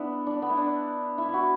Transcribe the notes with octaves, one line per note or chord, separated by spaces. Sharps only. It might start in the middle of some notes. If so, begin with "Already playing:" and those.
Already playing: B3 D4 E4
D4
B3
E4
D4
E4
E4 F#4